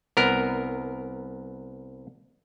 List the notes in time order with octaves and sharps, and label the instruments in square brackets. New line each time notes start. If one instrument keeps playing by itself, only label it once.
[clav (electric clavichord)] C2 B3 A#4